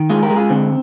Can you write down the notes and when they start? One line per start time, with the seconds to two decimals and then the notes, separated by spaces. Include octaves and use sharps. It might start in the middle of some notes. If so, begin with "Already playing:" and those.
Already playing: D#3
0.10 G#3 F4 G#4
0.23 G4 A#4
0.30 G#3
0.36 F4 G#4
0.50 D3 C4